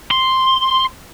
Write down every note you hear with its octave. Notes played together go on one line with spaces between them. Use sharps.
C6